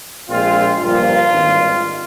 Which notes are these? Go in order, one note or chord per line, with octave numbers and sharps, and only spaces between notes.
A#1 A#2 G#3 C4 F4
G1 G2 F3 A#3 F4
G#1 G2 D#3